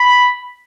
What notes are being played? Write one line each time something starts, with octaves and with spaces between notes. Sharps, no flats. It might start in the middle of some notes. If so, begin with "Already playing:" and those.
Already playing: B5